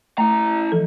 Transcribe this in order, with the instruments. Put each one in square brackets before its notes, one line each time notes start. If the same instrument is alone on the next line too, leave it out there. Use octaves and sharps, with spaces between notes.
[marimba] A3 [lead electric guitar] E4 A#5
[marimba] E3 F3 A4